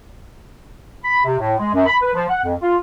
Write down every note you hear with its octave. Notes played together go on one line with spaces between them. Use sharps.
B5
C3
A2
G#3
F#2
B5
B4
F3
F#5
F2
F4